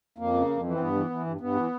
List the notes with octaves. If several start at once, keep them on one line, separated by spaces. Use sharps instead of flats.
F2 A#3
C#3
F2
E3
C4
G2 B3
E3
E3
G2
G2 B3
E3